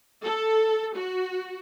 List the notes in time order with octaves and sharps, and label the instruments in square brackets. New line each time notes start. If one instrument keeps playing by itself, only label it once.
[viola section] A4
F#4